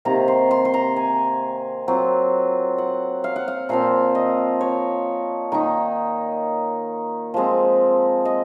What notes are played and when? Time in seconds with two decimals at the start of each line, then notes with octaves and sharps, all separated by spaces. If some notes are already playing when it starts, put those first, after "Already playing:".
0.05 C3 D#3 A#3 A#5
0.28 C6
0.51 C6
0.65 C6
0.74 A#5
0.96 G#5
1.88 F#3 C4 F4
2.78 F#5
3.24 F5
3.36 F#5
3.48 F5
3.69 A#2 F3 C4 F5
4.15 D#5
4.61 C#5
5.52 D#3 A#3 D#4
7.34 F3 G#3 C4
8.25 D#5